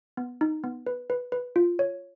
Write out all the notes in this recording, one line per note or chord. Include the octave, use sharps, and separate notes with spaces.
B3
D#4
B3
B4
B4
B4
F4
C#5